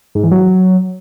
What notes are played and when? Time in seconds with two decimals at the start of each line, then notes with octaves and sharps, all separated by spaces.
0.15 G#2
0.23 E3
0.32 F#3